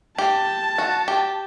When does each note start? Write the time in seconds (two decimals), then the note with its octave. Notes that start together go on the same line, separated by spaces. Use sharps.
0.18 G4 A5
0.78 F#4
1.08 G4